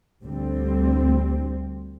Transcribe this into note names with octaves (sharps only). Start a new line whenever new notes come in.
D2 D3 G3 C4